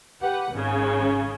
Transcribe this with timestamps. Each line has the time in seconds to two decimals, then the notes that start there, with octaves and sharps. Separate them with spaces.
0.21 G4 B4 F#5
0.51 G#1 C#3